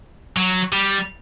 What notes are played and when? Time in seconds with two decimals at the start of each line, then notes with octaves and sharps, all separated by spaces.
0.37 F#3
0.73 G3